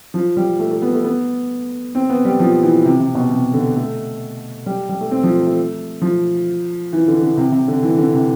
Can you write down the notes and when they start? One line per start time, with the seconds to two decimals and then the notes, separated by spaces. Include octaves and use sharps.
0.14 F3
0.37 G3
0.59 A3
0.71 A3
0.82 B3
0.93 A3
1.04 B3
1.95 C4
2.10 B3
2.25 G3
2.40 F3
2.63 E3
2.85 C3
3.00 C3
3.15 B2
3.31 C3
3.54 D3
3.76 A3
4.66 G3
4.89 G3
5.01 A3
5.11 C4
5.23 F3
5.34 A3
5.46 A3
6.01 F3
6.93 E3
7.08 D3
7.22 D3
7.37 C3
7.52 C3
7.68 D3
7.83 E3
7.98 D3
8.13 C3